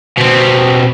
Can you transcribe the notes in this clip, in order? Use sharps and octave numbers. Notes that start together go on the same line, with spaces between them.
B2 C4